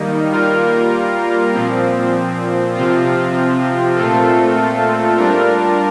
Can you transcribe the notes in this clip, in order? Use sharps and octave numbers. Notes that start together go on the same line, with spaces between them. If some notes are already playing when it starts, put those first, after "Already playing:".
Already playing: D#3 G3 A#3 D#4
G3 A#3 F4 A#4
A#2 F3 C4
C3 F3 C4 F4
A#2 A3 C4 F4 A4
G3 D4 F4 A#4